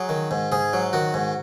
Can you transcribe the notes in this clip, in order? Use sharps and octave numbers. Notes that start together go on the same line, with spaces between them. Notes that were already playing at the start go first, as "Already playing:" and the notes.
Already playing: F#3 G#4
D#3
G#2
G#2 G#4
F#3
D#3 F#4
G#2